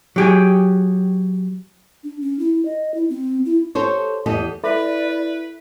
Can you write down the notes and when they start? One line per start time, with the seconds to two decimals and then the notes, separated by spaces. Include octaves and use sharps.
0.16 F#3 G4 G#4
2.04 D4
2.21 C#4
2.39 E4
2.65 D#5
2.94 E4
3.10 C4
3.46 E4
3.75 G4 A4 C5 C#5
4.26 E2 G4 A4 D#5
4.64 E4 A4 B4 D5 E5 B5